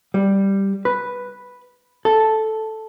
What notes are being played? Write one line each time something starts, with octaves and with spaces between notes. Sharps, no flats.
G3
B4
A4